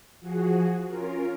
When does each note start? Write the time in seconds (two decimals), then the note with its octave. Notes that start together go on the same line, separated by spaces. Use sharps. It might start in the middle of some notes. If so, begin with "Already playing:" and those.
0.20 F3 F#4 G#4
0.87 C#4 F4 A#4